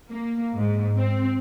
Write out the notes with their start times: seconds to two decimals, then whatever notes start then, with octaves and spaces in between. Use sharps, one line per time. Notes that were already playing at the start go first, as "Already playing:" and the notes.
0.10 A#3
0.57 G#2
0.98 C4